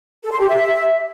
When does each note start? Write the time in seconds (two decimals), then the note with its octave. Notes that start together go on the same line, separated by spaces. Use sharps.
0.23 A4
0.31 C6
0.40 G4
0.48 E5